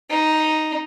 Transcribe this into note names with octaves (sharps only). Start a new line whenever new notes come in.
D#4